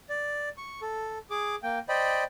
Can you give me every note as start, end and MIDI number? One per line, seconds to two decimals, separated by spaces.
0.09 0.49 74
0.57 0.81 85
0.82 1.18 69
1.30 1.55 68
1.30 1.55 86
1.63 1.79 58
1.63 1.79 79
1.89 2.24 72
1.89 2.24 74
1.89 2.24 75
1.89 2.24 79
1.89 2.24 83